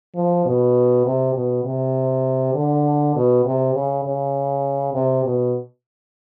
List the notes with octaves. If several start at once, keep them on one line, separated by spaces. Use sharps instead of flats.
F3
B2
C3
B2
C3
D3
B2
C3
C#3
C#3
C3
B2